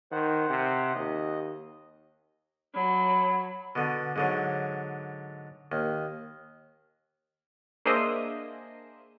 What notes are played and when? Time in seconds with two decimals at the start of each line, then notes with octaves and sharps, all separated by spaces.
0.12 D#3 C5 F#5
0.50 C3
0.95 D#2 D#5
2.74 F#3 B5
3.75 B2 D3
4.16 G#2 D3 F#3
5.72 D#2
7.85 A#3 D4 G#4 C5 D#5 E5